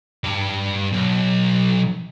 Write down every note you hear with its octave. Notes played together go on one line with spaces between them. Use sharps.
G2 G4
B1